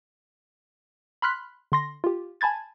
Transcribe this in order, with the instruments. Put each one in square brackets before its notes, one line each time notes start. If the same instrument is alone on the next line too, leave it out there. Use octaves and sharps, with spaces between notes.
[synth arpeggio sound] B5 C6 F6 F#6 B6
D3 C6 A#6
F4 G4
G#5 A5 B5 G#6 A6